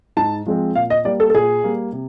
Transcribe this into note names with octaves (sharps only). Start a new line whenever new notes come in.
G#2 A5
F3 G#3 C4
A#2 F5
D#5
G3 A#3 D5
A4
A4
A#2 G#4
G3 A#3
C3